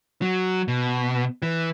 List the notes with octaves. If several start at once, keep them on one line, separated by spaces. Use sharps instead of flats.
F#3
B2
E3